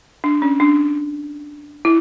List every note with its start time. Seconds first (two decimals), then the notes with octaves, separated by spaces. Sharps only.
0.24 D4
0.42 C#4
0.60 D4
1.85 E4